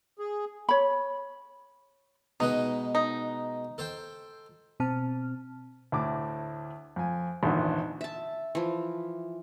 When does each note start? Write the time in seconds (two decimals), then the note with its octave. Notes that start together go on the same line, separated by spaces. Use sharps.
0.19 G#4
0.69 C#5 B5
2.40 B2 G#3 D#4 B4
2.95 D#4
3.78 A4 C5 G5
4.80 B2 C4 A5 F6
5.92 D2 A2 D6
6.96 F2 G#5
7.43 G#1 E2 A#2 D3
8.01 E5 A5
8.55 E3 F3